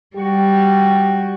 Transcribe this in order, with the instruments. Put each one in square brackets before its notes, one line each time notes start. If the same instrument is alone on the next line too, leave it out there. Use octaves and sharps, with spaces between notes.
[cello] G3 F#4 [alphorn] G4